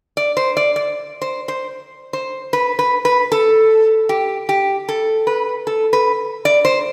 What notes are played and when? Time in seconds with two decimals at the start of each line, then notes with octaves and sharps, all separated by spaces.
0.17 D5
0.37 C5
0.57 D5
0.76 D5
1.22 C5
1.48 C5
2.13 C5
2.53 B4
2.79 B4
3.05 B4
3.32 A4
4.09 G4
4.49 G4
4.89 A4
5.27 B4
5.67 A4
5.93 B4
6.45 D5
6.65 C5